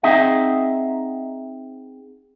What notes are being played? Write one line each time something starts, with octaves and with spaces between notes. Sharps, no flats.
C4 D#4 G#4 D#5 E5 F#5